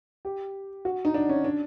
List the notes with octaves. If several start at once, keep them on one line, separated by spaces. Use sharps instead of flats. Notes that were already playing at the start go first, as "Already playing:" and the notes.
G4
F#4
D#4
D4
C#4
D4